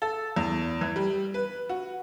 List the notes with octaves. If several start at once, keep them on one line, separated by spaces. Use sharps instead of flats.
A4
E2
E3
G3
B4
F#4